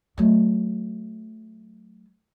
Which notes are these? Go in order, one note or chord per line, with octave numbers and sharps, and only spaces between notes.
F#3 A3